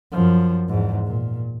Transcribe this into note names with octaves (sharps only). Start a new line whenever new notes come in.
F#2 F3
E2 G#2
A#2